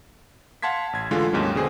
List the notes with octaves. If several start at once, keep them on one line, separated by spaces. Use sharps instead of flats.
F5 F#5 A5 C6 G#6 B6
A1 G#6
D3 E3 G#3 A3 F4
D#2 G#2 F#3 G#3 A#3 C#4
B2 D3 G#4 C5